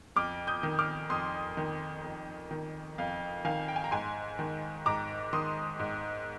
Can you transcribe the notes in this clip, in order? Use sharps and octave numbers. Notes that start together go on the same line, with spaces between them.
F2 D6 F6
D#6 G6
D#3
D6 F6
F2 C6 D#6
D#3
F2
D#3
F2 F5
D#3 F5 G#5
G5
G#5
A#5
G#2 G#5 C6
D#3
G#2 A#5 D6
D#3 C6 D#6
G#2